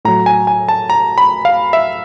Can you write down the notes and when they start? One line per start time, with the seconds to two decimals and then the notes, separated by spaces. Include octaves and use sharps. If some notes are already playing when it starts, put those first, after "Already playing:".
0.05 A2 F#3 A#5
0.26 G#5
0.47 G#5
0.69 A5
0.90 A#5
1.18 B5
1.45 F5
1.73 E5